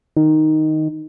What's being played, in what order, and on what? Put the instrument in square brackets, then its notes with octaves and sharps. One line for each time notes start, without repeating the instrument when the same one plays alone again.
[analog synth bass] D#3